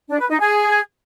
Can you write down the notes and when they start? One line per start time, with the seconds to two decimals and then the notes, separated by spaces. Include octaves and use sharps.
0.09 D4
0.19 B4
0.29 D#4
0.39 G#4